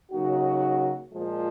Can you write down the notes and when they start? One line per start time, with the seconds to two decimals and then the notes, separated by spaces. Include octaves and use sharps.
0.12 C#3 F#3 A#3 D#4 F#4
1.12 A#2 F3 G#3